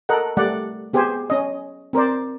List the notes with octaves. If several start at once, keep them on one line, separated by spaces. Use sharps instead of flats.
A4 A#4 D#5 F#5
G3 A3 D5 F#5
B3 G4 G#4 C5 G#5
C#4 D#5
C4 A#4 C5 D5